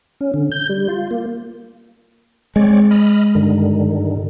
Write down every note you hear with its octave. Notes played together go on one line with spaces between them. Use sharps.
C#4
D3
G6
G3
F4
A#3
G#3 C4 C#5 D5
D#5 B5 F6
G2 D3 D#3